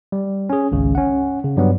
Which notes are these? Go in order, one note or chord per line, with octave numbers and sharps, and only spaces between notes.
G3
C#4 G#4
G#1 C#2 C#3
C#4 F#5
C#3
G2 F#3 G3 B3